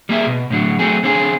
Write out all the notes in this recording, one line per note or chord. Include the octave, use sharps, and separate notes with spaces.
G3 A#3 G#4 E5
B2
A2 D3 F#3
F#3 A3 C4 G#4
D3 C4 C#4 F#4 G#4